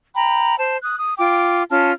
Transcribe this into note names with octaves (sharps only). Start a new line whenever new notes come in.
G5 A#5 B5
C5 A5
D#6 F#6
D#6
F4 G5 D6
C#4 F4 A5 F6